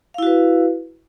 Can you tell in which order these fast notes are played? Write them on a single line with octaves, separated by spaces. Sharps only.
F5 E4 F#4 B4